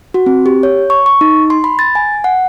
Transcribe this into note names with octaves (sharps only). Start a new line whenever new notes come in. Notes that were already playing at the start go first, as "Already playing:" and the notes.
F#4
C4
G4
C#5
C#6
C#6
D#4
C6
B5
A6
G#5
F#5